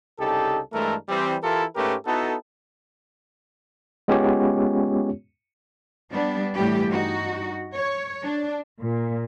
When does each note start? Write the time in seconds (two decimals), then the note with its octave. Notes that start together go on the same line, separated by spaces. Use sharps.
0.19 C2 C#3 D#4 G4 A4
0.73 G2 E3 G#3 A3 A4 A#4
1.09 E3 G3 C4
1.43 E3 E4 F4 G4 A4 A#4
1.76 G#2 A3 C#4 G4 A#4 B4
2.06 B3 D#4 E4 F#4 A4
4.08 G#3 B3 C#4 F4 G4 C#5
6.11 G3 B3 D4
6.55 A2 E3 G3 A3 B3 G4
6.89 G2 D#4 F#4
7.74 C#5
8.24 D4
8.81 A#2